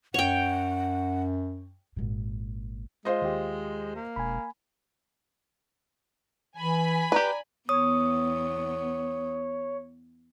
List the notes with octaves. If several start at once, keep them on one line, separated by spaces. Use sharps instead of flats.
F#2 C#5 F#5 G5
G#1 A#2
G#3 F4 C5 D#5
D#2 G4
A#3
E1 G#5 B5
E3 G#5 B5
G4 B4 D5 A#5
E2 B3 C#5 D#6